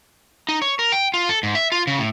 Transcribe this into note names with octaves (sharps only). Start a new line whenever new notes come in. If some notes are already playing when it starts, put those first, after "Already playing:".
D#4
C#5
A#4
G5
F4
A4
G#2
E5
F4
C#3
A2